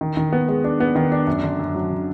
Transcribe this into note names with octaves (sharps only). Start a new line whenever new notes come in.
D#3
D#3
B3
G#3
D4
B3
D#3
D4
F#2
D3
F#2
F#3
D3